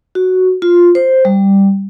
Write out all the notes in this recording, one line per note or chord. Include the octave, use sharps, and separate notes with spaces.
F#4
F4
C5
G3